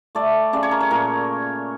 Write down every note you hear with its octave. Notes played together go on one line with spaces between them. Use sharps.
A3 D5
C#3 D5
C#5
A#4
C#5
A#2 A#4